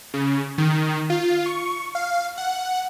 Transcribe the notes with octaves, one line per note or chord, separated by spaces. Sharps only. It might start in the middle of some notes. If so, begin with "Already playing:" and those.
C#3
D#3
F4
C#6
F5
F#5